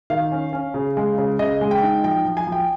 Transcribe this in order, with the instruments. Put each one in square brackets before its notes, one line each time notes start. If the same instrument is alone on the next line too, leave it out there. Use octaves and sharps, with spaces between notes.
[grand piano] D#3 F5
C#4
C#4
C#3
G#3
C#3
C#3 D#5
G#3
G5
D#4
F3 G5
F3
G#5
F3
G5